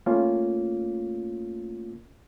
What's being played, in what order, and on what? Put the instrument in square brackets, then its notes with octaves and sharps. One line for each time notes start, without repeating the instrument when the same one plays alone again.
[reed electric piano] A3 A#3 C#4 F4